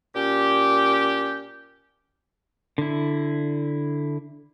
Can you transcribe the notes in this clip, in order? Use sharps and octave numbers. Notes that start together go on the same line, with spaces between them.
A#2 C#4 G4
D3 E4